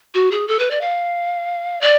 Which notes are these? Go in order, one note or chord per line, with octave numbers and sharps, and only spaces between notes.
F#4
G#4
A4
B4
D5
F5
D5